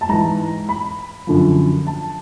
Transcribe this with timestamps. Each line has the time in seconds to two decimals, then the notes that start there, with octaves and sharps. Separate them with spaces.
0.01 A5
0.09 G#2 E3 A#5
0.69 B5
1.27 F#2 D3 F3
1.87 A5